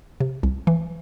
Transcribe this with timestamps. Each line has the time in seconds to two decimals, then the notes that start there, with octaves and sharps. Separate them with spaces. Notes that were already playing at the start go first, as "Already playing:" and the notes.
0.20 C3
0.43 C2
0.67 E3